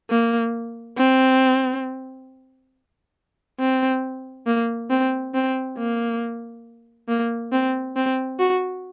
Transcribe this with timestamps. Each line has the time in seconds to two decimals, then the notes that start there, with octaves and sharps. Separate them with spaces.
0.10 A#3
0.98 C4
3.60 C4
4.46 A#3
4.91 C4
5.35 C4
5.78 A#3
7.09 A#3
7.52 C4
7.96 C4
8.39 F#4